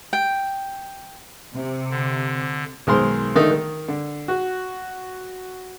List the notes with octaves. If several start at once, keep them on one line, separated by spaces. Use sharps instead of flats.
G5
C3
D3
B1 D#3 G#3 A#4 C5 C6
D3 D#3 A3 D#4
D#3
D3
F#4